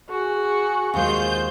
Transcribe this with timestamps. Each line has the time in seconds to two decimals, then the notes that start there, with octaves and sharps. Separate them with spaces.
0.11 F#4 G#4
0.94 D#2 G#3 F4 C5 G6